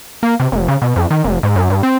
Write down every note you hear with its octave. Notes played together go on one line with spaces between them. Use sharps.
A#3
C3
F1
C#3
B2
F2
D#3
F1
G#2
F#2
G2
C4